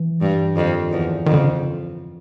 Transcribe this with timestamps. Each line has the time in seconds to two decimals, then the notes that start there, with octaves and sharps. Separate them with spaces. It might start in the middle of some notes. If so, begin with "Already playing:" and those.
Already playing: E3
0.22 G2
0.57 F2 D#3
0.91 E2
1.26 F2 D#3
1.34 D3
1.41 C#3